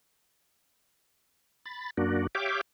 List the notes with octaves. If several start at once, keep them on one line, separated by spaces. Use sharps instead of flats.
B5 A6
F#2 A#3 D4 F#4
G4 C#5 E5 F5 G5 D6